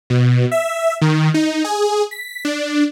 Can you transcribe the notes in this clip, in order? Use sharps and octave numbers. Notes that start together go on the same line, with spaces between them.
B2
E5
D#3
D#4
G#4
B6
D4